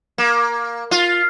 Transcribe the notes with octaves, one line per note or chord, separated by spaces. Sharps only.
A#3
F4